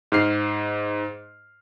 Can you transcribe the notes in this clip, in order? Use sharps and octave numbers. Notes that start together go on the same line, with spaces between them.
G#2 F6 C7